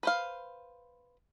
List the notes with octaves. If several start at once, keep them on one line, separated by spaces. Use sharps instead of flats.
B4 C5 F5